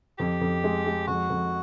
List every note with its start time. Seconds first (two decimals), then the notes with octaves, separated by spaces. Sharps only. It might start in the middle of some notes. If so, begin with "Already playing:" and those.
0.18 F2 G4
0.41 F2
0.64 G#3
0.86 G#3
1.07 F2 F#4
1.30 F2